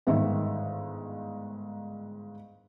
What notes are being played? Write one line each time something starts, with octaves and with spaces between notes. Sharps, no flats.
G1 G#2 D#3 E5